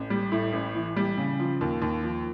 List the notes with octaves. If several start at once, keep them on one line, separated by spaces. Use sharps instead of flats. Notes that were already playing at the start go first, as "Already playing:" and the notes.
Already playing: A1
G3
A2
A1
E3
G3
C#3
F3
D#2
D#2
F3